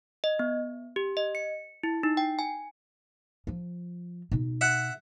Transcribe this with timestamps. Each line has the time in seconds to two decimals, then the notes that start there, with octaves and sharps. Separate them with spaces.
0.24 D#5
0.39 B3
0.96 G4
1.17 D#5
1.35 C#7
1.83 E4
2.03 D#4
2.17 G5
2.39 G#5
3.47 F3 F4
4.31 B2 D#4
4.61 E5 F#5